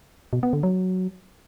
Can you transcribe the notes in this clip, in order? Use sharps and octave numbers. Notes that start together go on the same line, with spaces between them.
B2
B3
D3
F#3